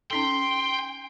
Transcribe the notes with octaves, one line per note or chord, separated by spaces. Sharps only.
C#4 D#4 A4 G5 C6